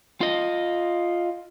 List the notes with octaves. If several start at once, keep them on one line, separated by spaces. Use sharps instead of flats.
F4 D#5